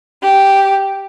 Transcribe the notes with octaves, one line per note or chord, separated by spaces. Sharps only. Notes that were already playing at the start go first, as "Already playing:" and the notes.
G4